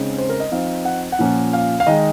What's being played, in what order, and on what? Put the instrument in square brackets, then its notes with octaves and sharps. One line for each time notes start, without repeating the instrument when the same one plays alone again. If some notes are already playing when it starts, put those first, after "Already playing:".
Already playing: [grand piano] C#3 G#3 C4 D#4
C5
A#4
D#5
F3 C4 D#4 F5
F#5
F#5
A#2 F3 A#3 C#4
F5
F5
D#3 G#3 D#4 D#5